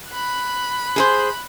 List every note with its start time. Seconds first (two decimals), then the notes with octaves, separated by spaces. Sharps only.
0.11 B5 F#6
0.96 G#4 A4 C5